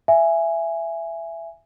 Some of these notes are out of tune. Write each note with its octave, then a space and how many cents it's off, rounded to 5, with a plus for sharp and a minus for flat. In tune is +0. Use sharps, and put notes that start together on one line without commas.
E5 +15 G#5 +0